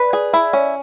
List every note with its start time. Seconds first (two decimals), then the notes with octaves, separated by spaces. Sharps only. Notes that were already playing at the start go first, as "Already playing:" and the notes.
Already playing: B4 D5
0.13 G#4
0.33 E4
0.53 C#4